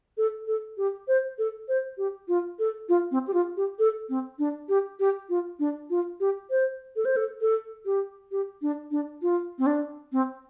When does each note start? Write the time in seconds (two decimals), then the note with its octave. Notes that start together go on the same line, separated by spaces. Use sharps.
0.17 A4
0.47 A4
0.77 G4
1.08 C5
1.38 A4
1.68 C5
1.98 G4
2.28 F4
2.59 A4
2.89 F4
3.11 C4
3.27 G4
3.34 F4
3.57 G4
3.79 A4
4.09 C4
4.39 D4
4.69 G4
5.00 G4
5.29 F4
5.59 D4
5.90 F4
6.20 G4
6.51 C5
6.96 A4
7.05 C5
7.16 A4
7.41 A4
7.86 G4
8.32 G4
8.62 D4
8.91 D4
9.22 F4
9.58 C4
9.66 D4
10.12 C4